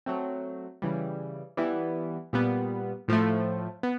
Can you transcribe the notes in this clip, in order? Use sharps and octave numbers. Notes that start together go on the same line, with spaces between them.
F#3 A3 C4
C#3 E3 G3
E3 G3 B3 E4
A#2 G3 B3
A2 F3 A3
B3